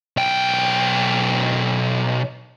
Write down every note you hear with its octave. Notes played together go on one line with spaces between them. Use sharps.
B1 G5